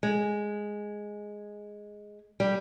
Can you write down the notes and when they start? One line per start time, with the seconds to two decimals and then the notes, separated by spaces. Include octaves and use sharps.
0.03 G#3
2.40 G3